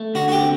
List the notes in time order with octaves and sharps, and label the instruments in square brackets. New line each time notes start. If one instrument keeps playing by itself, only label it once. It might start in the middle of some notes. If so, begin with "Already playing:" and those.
Already playing: [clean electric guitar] A3
[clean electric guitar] D3 [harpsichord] F#4
[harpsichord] F#4
G4
[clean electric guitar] C4